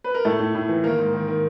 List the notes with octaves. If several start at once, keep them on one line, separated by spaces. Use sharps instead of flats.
B4
A#4
A2 A3 A4
A2
A2
E3
D#3 A#3 A#4
G#2
D#3
D#3